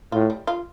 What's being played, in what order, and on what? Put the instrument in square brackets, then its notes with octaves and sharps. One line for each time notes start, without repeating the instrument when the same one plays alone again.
[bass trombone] A2 [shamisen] F4
[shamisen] G3
F4